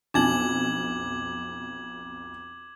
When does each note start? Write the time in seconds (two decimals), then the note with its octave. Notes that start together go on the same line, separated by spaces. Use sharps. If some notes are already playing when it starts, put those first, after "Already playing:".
0.14 B1 F2 D4 D#4 D6 G#6 F#7